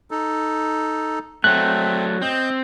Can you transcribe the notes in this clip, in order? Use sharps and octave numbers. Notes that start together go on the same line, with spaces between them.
D#4 A4
F#3 A3 C4 F#6
C4 D#5 G6